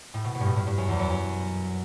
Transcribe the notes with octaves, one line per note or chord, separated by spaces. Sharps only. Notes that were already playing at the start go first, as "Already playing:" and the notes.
A2
B2
B2
G2
A2
G2
G2
F#2
E2
F#2
F#2